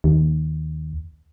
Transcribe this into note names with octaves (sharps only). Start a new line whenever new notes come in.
D#2